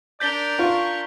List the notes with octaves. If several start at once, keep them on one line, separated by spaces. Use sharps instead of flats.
D4 A#4 D5 G6 B6 G7
F4 C#6